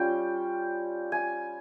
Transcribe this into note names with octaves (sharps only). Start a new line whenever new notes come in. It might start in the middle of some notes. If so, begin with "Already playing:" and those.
Already playing: G3 C#4 F4 G5
G#5